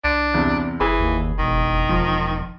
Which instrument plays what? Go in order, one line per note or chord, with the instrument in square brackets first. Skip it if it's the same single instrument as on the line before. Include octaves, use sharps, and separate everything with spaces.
[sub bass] C2 [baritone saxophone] D4
[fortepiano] E2 C3
[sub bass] F#1 [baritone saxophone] E3 [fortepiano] G#4 B5
[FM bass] D#2
[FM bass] E1 [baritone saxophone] D#3
[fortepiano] F3